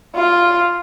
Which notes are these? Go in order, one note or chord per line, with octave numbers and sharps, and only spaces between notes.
F4